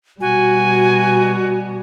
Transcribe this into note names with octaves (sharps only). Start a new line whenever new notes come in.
B2 G3 F#4 G#5